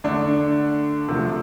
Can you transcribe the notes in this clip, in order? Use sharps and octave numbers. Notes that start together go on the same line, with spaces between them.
D3 A3 D4
C3 F3 A3